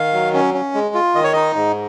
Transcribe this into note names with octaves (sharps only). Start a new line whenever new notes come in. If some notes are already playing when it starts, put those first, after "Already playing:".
Already playing: D#3 F5
F#3
C#4
C#4
G#3
F4
D#3 D#5
C#5
D#4 D#5
G#2